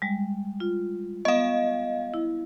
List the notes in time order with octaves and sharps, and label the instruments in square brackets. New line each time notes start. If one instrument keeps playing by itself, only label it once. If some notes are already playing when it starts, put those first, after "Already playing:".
[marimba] G3 G#3
F4
[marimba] B3 [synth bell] D#5 F5
[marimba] E4